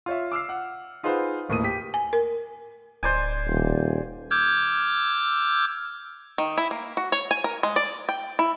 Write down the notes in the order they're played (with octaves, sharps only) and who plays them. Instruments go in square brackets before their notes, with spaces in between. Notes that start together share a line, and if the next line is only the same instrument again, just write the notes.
[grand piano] F4 C#5 E5
D6 E6 F6 C7
F#5
D#4 F4 G#4 B4 C5 F#5
G#1 D#2 A2 A#4 D#6 D#7
G4 B6
[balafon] G#5
A#4
[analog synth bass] D1 [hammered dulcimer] C5 D5 G#5
[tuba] D#1
[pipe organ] D6 E6 F6 G6 G#6
[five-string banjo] D#3
E4
A#3
F#4
C#5
G#5
A#4
G#3
D5
G5
E4